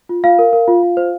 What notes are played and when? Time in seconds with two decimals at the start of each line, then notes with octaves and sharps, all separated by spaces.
0.09 F4
0.24 F4 F5
0.39 A#4
0.53 A#4
0.68 F4
0.83 F4
0.97 C5